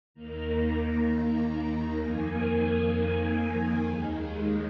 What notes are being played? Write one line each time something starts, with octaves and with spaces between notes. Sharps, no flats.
D#2 D#3 A#3 A#5
F2 D#3 A#3 G#5
D#2 D#3 G#3